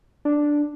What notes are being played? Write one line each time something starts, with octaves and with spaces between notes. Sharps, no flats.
D4